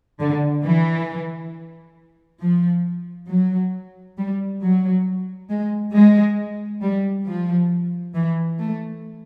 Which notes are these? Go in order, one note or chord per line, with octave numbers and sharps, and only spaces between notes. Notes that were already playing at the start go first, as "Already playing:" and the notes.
D3
E3
F3
F#3
G3
F#3
G#3
G#3
G3
F3
E3
A3